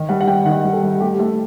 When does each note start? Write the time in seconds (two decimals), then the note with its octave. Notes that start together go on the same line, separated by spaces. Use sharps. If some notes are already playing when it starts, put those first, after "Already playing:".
Already playing: D#3
0.09 G3 F#5
0.21 F#5
0.27 G3 G5
0.45 D#3 F#5
0.64 G3
0.73 A4
0.83 G3
1.00 A3 G4
1.19 A3 A4